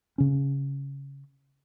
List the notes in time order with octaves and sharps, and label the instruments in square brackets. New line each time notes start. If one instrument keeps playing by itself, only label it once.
[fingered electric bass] C#3 C#4